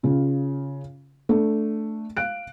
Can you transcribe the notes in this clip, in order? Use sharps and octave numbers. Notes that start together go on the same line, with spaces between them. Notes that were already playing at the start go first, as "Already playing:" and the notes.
C#3 F4
A3 D4
F5 F#6 D7